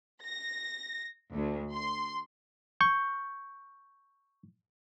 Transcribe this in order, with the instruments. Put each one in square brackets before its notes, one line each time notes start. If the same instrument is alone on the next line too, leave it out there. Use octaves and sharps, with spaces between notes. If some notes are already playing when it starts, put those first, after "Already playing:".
[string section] A#6
D2
C6
[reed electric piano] C#6 G6